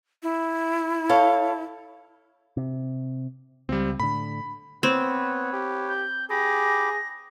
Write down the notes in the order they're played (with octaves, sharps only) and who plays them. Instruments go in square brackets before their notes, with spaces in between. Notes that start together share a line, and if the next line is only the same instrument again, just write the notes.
[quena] E4
[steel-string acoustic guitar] A4 C#5 F5
[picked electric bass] C3
[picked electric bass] C#2 [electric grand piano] G3 C4
[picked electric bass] A2 D3 [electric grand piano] B5
[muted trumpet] B3 [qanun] C4 [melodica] B4 C#5
[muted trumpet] G4
[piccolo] G6
[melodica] G4 B5 D6 [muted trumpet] G#4 [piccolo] A#6